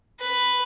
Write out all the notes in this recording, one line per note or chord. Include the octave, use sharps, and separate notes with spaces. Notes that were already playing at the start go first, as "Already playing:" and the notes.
B4